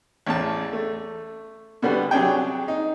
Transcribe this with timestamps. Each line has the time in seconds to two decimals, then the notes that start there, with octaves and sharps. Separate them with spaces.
0.27 A1 E2 A5
0.73 A3
1.82 B2 D3 G3 B3
2.11 C3 F#3 D4 G#4 G5
2.68 D#4